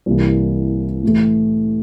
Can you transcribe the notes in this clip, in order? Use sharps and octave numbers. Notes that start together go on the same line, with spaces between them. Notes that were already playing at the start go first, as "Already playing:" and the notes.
C2 C3 E3 A#3
A2 E3 A3